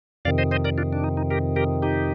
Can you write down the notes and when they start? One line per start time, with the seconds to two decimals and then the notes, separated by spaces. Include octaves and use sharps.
0.25 F2 C3 D#3 D5 F5
0.38 C5 D#5
0.51 C5 D#5
0.64 A#4 D5
0.78 D4 F4
0.93 D4
1.04 D#4
1.17 D#4
1.30 G4 A#4
1.56 G4 A#4
1.82 D#4 G4